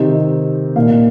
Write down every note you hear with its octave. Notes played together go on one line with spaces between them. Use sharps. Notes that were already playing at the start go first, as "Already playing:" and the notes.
Already playing: C3 D#3 C4 D#4
A#2 A#3 D#4 F5